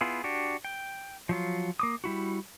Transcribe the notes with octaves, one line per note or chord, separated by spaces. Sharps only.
B3 E4 F4 G#4
D4 F#4 G4
G5
F3 F#3 F4
A#3 D6 D#6
G3 E4 F#4